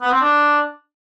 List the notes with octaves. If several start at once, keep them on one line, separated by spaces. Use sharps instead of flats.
B3
C4
D4